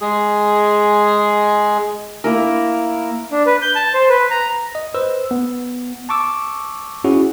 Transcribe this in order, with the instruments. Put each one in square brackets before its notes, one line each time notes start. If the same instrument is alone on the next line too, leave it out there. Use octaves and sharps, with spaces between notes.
[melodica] G#3 G#4
[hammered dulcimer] A#3 E4 A#4
[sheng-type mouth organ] D4
B4
G6
A5
C5
B4
A#5
[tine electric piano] D#5
B4 C5 E6
B3
A5 C#6 D6 E6
C#4 E4 F#4 G#4